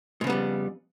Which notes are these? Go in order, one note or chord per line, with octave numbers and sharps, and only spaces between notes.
F2 G#2 C#3 G3 B3